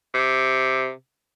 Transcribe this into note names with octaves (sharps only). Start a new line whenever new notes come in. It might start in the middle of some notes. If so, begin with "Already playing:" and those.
C3